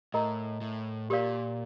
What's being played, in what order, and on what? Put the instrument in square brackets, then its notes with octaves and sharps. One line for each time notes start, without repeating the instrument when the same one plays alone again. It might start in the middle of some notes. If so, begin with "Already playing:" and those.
[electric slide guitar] A2 [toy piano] A#4 D#5 A#5
[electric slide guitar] A2
[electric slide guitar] A#2 [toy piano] G4 A#4 D5 F5